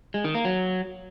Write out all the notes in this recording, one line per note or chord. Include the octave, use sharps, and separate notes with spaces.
G#3
D#3
A#3
F#3